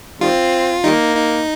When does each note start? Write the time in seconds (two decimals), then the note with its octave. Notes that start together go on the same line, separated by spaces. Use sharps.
0.20 D#3 G3 C4 F4
0.84 D#3 G3 A#3 D#4
1.17 D#4